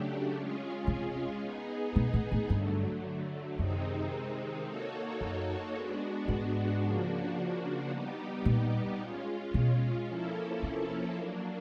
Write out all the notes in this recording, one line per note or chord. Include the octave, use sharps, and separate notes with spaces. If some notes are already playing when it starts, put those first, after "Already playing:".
Already playing: C#3 F#3 A3 D4 G4
G#3 C#4 F4 G#4
C3
B3 D#4 G#4
B2
A2
A2
G2 D3 F#3 A3
F#2 C3 D#3 G#3 C4 D#4
A#3 D#4 F#4 A4 C#5
F#2
G#3 B3 D4 F#4
G#2
C#3 F3 A#3 D4 F#4
G3 B3 D#4 G4
A#2
G#3 C#4 F4
B2
F3 A#3 C#4 E4 A4
C3
F#3 A#3 D4